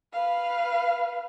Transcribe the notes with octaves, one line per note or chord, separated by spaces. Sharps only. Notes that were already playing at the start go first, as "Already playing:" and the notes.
B4 F5